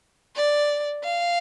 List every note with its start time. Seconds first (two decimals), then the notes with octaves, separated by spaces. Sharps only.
0.36 D5
1.04 F5